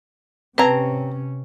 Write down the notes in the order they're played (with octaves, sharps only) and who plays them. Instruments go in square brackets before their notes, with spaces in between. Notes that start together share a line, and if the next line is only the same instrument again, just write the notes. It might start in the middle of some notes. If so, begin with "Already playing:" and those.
[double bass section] C3 C#4 [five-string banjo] C4 A#5 [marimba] B4 A5 G#6